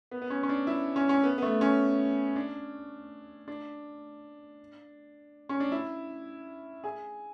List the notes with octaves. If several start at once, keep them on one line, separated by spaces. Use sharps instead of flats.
B3
B3
C#4
C#4
D4
E4
C#4
C#4
B3
B3
A3
C#4
D4
D4
C#4
D4
E4
G#4